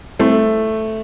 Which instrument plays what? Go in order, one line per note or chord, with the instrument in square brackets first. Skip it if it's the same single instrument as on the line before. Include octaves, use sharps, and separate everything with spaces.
[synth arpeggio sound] G3 C4 E4 A4 C5 [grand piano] A3